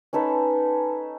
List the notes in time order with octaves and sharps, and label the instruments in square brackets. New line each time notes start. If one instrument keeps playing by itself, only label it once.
[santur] C#4 D#4 A4 B4